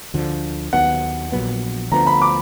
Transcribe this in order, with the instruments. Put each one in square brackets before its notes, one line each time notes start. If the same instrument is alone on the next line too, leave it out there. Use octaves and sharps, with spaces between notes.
[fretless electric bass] D2 D3 F3
[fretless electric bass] D#2 D#3 F#3 B3 [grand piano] F#5
[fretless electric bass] A#1 A#2 F#3 B3
[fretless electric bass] D2 D3 F3 B3 [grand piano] A#5
[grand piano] B5
D6